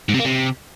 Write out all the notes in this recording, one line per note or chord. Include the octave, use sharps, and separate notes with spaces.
G#2
C3
A#3
C3